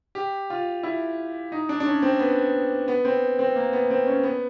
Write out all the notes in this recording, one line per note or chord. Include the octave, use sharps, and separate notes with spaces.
G4
F4
E4
D#4
D4
D4
C#4
C4
B3
B3
C4
C4
A#3
B3
C4
C#4
B3